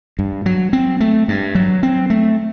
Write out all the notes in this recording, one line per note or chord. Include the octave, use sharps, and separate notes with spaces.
G2
F#3
C4
A3
G2
F#3
C4
A3